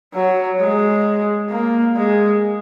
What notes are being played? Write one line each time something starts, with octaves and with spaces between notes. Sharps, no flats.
F#3
G#3
A#3
G#3